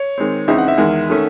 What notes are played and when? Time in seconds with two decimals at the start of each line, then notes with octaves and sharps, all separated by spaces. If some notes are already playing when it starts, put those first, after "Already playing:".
Already playing: C#5
0.18 D#3 G#3 C4
0.48 C#2 C#3 E3 C4 D#4 E5
0.58 F#5
0.68 E5
0.78 E2 D#3 G#3
1.10 D#3 A3 C#4